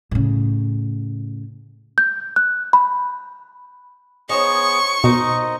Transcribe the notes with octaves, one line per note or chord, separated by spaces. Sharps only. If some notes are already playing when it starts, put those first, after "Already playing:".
A2 C#3
G6
F#6
B5
B3 D#4 G#4 C5 C#5 C#6
B2 D#4 A#4 C5 D#5